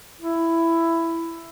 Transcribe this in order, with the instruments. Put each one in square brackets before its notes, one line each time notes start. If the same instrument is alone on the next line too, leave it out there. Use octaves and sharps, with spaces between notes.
[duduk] E4